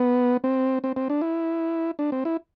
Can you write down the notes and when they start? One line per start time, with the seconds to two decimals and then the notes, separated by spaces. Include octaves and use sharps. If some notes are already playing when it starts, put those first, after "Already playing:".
Already playing: B3
0.44 C4
0.84 C4
0.96 C4
1.10 D4
1.21 E4
1.99 D4
2.12 C4
2.25 E4